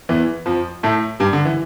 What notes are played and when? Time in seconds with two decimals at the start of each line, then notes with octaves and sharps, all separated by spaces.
0.09 E2 E3
0.46 F2 F3
0.83 A2 A3
1.20 G2 G3
1.33 D3
1.45 E3